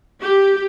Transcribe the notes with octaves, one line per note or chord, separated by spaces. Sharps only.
G4